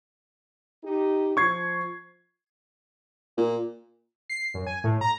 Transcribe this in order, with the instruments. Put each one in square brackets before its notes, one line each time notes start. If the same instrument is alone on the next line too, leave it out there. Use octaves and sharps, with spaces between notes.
[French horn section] D#4 G4
[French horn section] F3 [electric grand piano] C#6 G#6 C7
[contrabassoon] A#2
[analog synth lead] C7
F#2
G#5
A2
A#5